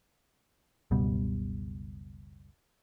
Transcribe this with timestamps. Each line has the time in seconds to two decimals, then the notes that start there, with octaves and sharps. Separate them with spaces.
0.91 F#1 C#2 B2 G3